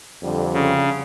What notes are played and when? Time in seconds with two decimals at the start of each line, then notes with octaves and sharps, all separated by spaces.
0.22 F2 D3 G3
0.53 C#3